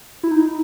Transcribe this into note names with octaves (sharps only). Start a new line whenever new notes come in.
E4
D#4